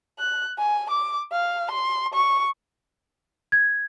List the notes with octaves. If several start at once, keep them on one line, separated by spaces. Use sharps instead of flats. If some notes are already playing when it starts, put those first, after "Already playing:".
F#6
G#5
D6
F5
C6
C#6
G#6